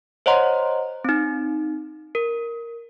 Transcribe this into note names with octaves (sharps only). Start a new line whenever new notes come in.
C5 C#5 D#5 F#5 A#5 C6
C4 D#4
A#4